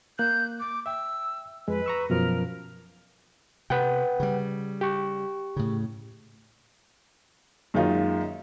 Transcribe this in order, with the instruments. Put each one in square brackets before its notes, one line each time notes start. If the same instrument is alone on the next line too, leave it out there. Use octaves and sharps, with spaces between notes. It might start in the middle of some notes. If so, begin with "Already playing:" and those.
[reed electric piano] A#3 F#6 [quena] G6
[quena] D6
[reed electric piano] E5 G5 [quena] E6
[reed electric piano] F2 G#3 [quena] B4
[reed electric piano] A#5 C#6 E6
[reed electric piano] F#2 B2 F3 [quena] A#4
[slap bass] C3 [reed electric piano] B4 F#5 G5
[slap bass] C#3 G3
[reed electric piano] G4 C#6
[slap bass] A2 C#3
[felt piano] F#2 D#3 G#3 A#3 D#4 F4